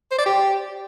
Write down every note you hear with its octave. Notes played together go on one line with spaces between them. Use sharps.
C5
D5
G4